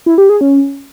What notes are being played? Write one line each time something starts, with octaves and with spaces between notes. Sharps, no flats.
E4
G4
G#4
C#4